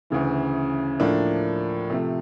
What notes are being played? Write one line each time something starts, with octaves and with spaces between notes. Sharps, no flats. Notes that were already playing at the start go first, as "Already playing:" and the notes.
D2 C#3 E3
A2 F3 A#3 D4
C3 F3 A3